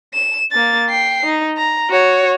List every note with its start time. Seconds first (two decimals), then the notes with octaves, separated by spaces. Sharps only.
0.14 E7
0.52 A#3 A6
0.89 G5 C7
1.25 D#4
1.57 A#5
1.90 F#4 C#5